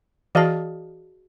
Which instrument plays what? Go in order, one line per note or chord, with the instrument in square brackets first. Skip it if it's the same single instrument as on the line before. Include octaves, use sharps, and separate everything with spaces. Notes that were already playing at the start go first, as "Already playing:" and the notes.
[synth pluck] E3 [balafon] F#4 G#4 A5 [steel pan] D5 D#5 F5